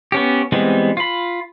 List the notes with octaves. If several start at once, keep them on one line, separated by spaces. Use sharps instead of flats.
B3 C#4 G4
E3 G3 G#3 B3 C4
F4 B5